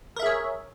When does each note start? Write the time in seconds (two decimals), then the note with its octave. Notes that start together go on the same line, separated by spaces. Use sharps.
0.16 A#4
0.20 E5
0.23 G#4
0.26 C#5